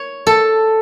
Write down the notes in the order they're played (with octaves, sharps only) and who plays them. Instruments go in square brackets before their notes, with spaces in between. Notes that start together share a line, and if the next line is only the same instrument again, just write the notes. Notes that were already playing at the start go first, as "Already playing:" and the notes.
Already playing: [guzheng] C#5
A4